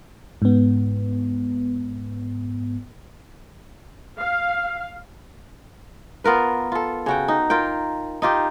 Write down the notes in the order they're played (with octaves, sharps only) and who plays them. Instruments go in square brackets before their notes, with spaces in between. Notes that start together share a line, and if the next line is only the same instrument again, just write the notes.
[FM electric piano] G#2 B3
[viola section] F5
[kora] B3 F4 A#4 B4
F4 A4
C#3 F#4 G5
D#4
F4 A#4 G5
D#4 F4 G4